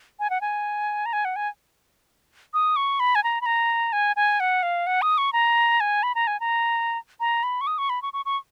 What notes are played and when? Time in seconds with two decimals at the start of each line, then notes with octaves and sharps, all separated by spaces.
0.20 G#5
0.30 F#5
0.41 G#5
1.06 A#5
1.13 G#5
1.25 F#5
1.36 G#5
2.54 D#6
2.76 C#6
3.00 B5
3.15 G#5
3.24 A#5
3.41 B5
3.46 A#5
3.93 G#5
4.16 G#5
4.40 F#5
4.63 F5
4.87 F#5
5.02 D#6
5.18 C#6
5.33 A#5
5.80 G#5
6.03 B5
6.15 A#5
6.27 G#5
6.40 A#5
7.20 A#5
7.43 B5
7.61 C#6
7.67 D#6
7.78 C#6
7.90 B5
8.02 C#6
8.13 C#6
8.25 C#6